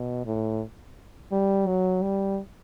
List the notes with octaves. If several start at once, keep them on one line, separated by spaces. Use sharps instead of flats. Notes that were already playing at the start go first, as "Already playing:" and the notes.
Already playing: B2
A2
G3
F#3
G3